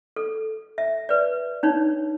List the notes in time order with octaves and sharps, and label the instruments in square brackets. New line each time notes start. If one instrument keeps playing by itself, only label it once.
[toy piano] A4
E5
B4 D5
D4 D#4 C#5